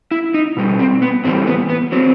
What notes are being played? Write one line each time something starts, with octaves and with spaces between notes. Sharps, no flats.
E4
D#4
B2 G3
C4
B3
A2 E3 G3 C4
B3
B3
F#3 C4